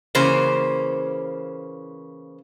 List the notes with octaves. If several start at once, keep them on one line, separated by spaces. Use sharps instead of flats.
C#3 E3 A#3 C5